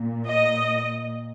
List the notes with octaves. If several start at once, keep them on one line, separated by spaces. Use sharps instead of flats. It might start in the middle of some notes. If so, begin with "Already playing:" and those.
Already playing: A#2
D#5